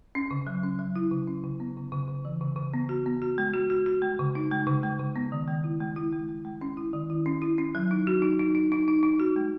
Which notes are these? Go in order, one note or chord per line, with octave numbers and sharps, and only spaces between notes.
C#4
C#3
F#3
C#4
F#3
E4
C#3
C#4
C#3
B3
C#3
C#3
C#3
E3
C#3
C#3
B3
F#4
B3
F#4
G#3
F#4
F#4
F#4
G#3
C#3
D#4
G#3
C#3
G#3
C#3
B3
D#3
G#3
E4
G#3
E4
G#3
G#3
G#3
C#4
E4
D#3
E4
C#4
E4
C#4
F#3
D#4
F#4
D#4
D#4
D#4
D#4
D#4
D#4
F#4
G#3